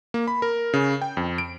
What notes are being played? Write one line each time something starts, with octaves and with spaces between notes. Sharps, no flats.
A#3
B5
A#4
C#3
G5
F2
D7